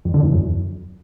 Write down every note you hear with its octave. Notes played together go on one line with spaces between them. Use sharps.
F2
D3
E2
F#2